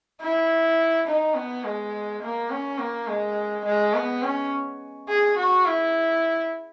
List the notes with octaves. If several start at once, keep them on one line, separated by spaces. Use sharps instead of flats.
E4
D#4
B3
G#3
A#3
C#4
A#3
G#3
G#3
B3
C#4
G#4
F#4
E4